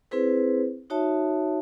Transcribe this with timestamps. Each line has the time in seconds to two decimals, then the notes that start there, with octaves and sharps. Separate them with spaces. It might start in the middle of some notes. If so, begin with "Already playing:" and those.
0.11 C4 E4 G#4 B4 C5
0.90 D#4 F#4 C#5 E5 A5